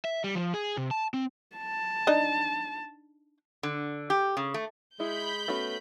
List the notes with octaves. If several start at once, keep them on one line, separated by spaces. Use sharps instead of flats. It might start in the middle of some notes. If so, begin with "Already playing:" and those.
E5
G3
F3
G#4
C3
A5
C4
A5
D4 D#4 D#5
D3
G4
C#3
A3
G#3 E4 B5 G6
A3 B3 C#4 F#4